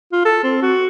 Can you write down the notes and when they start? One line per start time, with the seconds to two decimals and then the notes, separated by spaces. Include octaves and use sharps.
0.12 F4
0.25 A4
0.43 C4
0.62 F#4